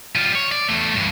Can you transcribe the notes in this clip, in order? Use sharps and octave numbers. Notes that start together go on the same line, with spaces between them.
G3 F4
C#5
D5
E2 A3
G2 E3